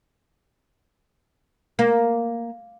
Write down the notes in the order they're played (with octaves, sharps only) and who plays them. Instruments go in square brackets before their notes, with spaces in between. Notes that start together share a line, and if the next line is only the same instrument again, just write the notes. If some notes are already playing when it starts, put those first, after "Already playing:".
[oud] A#3